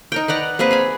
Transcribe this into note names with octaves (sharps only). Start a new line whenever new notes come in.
D#4 A#4 G5
B4 D5 F#5 A#5
A#3 C4 G#4 B4
G#4 G#5 B5